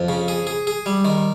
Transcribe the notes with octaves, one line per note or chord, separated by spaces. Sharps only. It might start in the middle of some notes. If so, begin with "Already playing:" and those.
Already playing: F2
C#3
G#4
G#4
G#4
G3
D#3